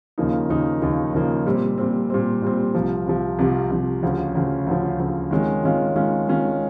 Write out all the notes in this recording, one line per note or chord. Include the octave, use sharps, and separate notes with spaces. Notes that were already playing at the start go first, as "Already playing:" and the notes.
D#2 C#3 F3 A#3 D#4
D#2 C#3 F3 A#3 D#4
D#2 C#3 F3 A#3 D#4
D#2 C#3 F3 A#3 D#4
A#2 G3 C4
A#2 G3 C4
A#2 G3 C4
A#2 G3 C4
C2 C3 F3
C2 C3 F3
C2 C3 F3
C2 C3 F3
D2 C#3 F3
D2 C#3 F3
D2 C#3 F3
D2 C#3 F3
D#3 G#3 C#4 F4
D#3 G#3 C#4 F4
D#3 G#3 C#4 F4
D#3 G#3 C#4 F4